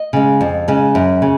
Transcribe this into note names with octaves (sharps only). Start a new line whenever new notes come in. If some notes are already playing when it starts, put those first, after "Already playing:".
Already playing: D#5
C#3 G#3
F2
C#3 G#3
F#2
C#3